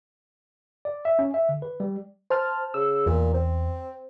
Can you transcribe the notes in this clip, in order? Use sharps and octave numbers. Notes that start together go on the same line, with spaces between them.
D5
E5
C#4
E5
D3
B4
G3
C5 A5 F6
C#3 E6
E2 A#2
C4